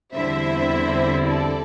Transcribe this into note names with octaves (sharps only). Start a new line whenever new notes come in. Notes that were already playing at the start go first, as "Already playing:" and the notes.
E2 D3 G3 C4 E4 C5 E5
A4 D5